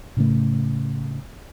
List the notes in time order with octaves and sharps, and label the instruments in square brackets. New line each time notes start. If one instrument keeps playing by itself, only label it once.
[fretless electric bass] A2 C#3 A3